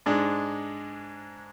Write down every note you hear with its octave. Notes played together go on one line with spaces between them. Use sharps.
G#2 G#3 D4